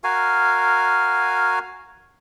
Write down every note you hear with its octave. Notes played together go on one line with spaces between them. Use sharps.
F#4 A#4 F5 G#5